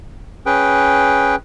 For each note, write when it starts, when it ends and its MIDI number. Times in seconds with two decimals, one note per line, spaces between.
0.46 1.35 61
0.46 1.35 68
0.46 1.35 71
0.46 1.35 79